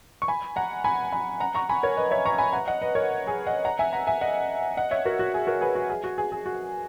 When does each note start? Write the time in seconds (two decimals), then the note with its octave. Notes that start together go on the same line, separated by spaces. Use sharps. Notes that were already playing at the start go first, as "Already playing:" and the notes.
0.22 C#6
0.28 G#5 B5
0.56 F#5 A#5
0.84 G#5 B5
1.12 G#5 B5
1.40 F#5 A#5
1.55 A#5 C#6
1.69 G#5 B5
1.83 A#4 C#5
1.97 B4 D#5
2.11 C#5 E5
2.26 A#5 C#6
2.38 G#5 B5
2.52 F#5 A#5
2.67 D#5 F#5
2.82 B4 D#5
2.95 A#4 C#5
3.27 G#4
3.47 D#5 F#5
3.65 F#5 A#5
3.79 E5 G#5
3.93 F#5 A#5
4.07 E5 G#5
4.21 D#5 F#5
4.77 D#5 F#5
4.91 C#5 E5
5.05 F#4 A#4
5.19 F#4
5.34 G#4
5.47 F#4 A#4
5.61 G#4 B4
5.75 F#4
5.90 G#4
6.04 F#4
6.18 G#4
6.32 G#4
6.46 F#4